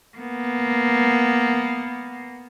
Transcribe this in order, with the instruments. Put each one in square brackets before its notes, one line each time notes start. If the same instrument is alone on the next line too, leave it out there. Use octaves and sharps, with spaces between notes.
[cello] A#3 B3